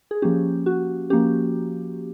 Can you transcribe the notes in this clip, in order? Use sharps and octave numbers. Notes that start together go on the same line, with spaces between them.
G#4
F3 A#3 C#4 G4
F#4
F3 A#3 C#4 G4